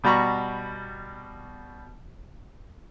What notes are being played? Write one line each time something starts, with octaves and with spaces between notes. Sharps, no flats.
B2 G3 F#4 A#5 B5 C#6